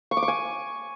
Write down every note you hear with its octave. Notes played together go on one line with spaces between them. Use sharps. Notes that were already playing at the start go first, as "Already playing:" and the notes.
C#6
D6
C#6
G#5